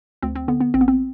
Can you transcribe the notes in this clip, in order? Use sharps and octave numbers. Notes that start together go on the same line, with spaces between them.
D2 C4
C4
D3 B3
B3
A1 C4
B3
C4